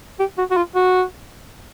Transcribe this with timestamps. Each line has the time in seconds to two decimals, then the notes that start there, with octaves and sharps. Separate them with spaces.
0.19 G4
0.38 F#4
0.51 F#4
0.57 F4
0.75 F#4